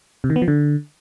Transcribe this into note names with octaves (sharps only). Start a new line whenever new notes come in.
C3
D#3
B3
F3
D3